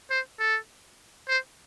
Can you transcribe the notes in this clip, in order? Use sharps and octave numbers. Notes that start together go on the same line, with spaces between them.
C5
A4
C5